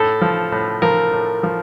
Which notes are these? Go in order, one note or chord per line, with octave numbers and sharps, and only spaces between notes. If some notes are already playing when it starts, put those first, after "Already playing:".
Already playing: A2 A4
F3
A2
F3 A#4
A2
F3